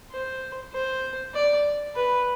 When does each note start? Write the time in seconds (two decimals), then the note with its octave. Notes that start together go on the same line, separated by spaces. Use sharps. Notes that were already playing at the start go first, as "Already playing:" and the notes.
0.11 C5
0.72 C5
1.34 D5
1.95 B4